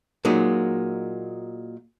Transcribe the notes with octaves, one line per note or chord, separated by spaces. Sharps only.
A#2 F#3 G#3 D#4